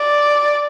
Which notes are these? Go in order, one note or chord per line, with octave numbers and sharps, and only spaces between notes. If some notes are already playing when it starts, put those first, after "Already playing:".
Already playing: D5